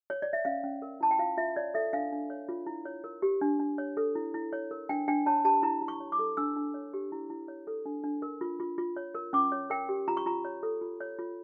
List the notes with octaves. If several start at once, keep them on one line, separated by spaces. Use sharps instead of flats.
C#5
D5
E5
C#4 F5
C#4
A#4
E4 A5
G5
F4 F5
F4 E5
C#5 D5
A4 E5
D4 F5
D4
C#5
F4
E4
C#5
A#4
G4
D4
D4
C#5
A4
E4
E4
C#5
A#4
D4 G5
D4 G5
C#5 A5
G4 A5
E4 A#5
E4
C#6
C#5
D6
A4
D4 E6
D4
C#5
G4
E4
E4
C#5
A4
D4
D4
A#4
F4
F4
F4
C#5
A#4
C#4 D6
C#5
A#4 G5
G4
F4 A#5
C#6
F4 A#5
C#5
A4
F4
C#5
F4